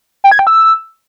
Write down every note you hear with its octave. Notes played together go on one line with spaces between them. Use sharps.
G5
G#6
G5
E6